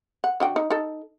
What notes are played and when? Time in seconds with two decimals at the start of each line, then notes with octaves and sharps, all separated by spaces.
0.24 F#5
0.40 D3 F#4 G5
0.56 D#4
0.70 D#4 A4